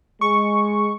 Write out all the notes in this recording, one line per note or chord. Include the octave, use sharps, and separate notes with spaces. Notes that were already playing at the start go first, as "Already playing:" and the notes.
G#3 C#6